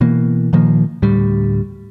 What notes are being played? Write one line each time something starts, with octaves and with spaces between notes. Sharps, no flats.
B2 E3 A#3
A#2 D#3 F3 A#3
D2 A2 G3